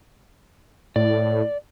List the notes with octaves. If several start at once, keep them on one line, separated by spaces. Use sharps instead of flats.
A2 D5